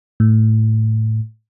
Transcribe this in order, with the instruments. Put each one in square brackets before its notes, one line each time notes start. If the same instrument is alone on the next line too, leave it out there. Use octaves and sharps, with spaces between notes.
[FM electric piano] A2